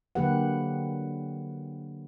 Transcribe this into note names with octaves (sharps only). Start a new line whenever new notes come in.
D3 F#3 A#3 G4 B4 F#5